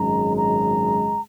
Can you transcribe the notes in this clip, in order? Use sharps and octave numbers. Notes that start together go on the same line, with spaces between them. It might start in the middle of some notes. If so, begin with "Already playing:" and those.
Already playing: G#1 F#2 C#3 G#3 A#5
A#5